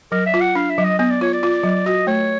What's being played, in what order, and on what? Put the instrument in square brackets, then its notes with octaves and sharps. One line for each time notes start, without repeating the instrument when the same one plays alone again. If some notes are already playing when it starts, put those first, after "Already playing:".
[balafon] F#3 [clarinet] A#4
[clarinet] E5
[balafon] F4
[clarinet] F#5
[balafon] D4 [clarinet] F5
[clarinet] E5
[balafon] F#3
[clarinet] D#5
[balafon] B3 [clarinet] D#5
[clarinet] D5
[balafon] F4 [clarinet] C#5
[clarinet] D5
[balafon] F4
F#3
[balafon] F#4 [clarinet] D#5
[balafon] A3 [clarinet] C#5